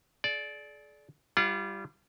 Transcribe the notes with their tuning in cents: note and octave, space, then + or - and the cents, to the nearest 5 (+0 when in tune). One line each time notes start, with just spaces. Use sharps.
G#4 +45 D5 -5
G3 +0 F4 -35 F#5 +0